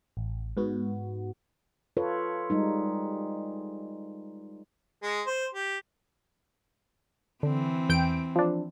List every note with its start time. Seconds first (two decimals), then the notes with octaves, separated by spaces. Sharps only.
0.17 A1
0.57 G#2 B3 F#4
1.97 F4 A4 B4 C#5
2.50 G3 G#3 D#4
5.03 G#3
5.27 C5
5.55 G4
7.43 D3 E3 C4
7.89 E2 G5 D7
8.36 F3 D4